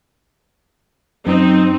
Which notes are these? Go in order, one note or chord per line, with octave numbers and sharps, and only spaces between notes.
F#2 C4 D#4